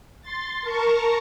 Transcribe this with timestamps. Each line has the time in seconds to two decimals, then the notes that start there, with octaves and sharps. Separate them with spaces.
0.22 C6 A6
0.62 A#4 A5 A#5 C#6